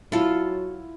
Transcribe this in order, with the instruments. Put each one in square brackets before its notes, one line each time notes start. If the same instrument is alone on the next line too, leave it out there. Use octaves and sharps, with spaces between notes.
[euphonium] F#3 [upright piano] E4 [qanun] F4 A4